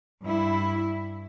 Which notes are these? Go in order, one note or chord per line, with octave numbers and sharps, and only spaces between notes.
G2 E4